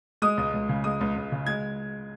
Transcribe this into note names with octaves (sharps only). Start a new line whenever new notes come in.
G#3 D#6
C#2
C#2
C#3
G#3 D#6
C#2
C#2
C#3
G#3 G#6